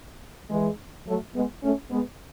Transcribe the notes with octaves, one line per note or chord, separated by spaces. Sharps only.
E3 G#3
F#3 A3
G#3 B3
A3 C#4
G#3 B3